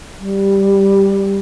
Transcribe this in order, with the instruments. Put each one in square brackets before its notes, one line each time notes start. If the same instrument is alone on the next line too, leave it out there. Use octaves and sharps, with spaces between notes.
[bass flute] G3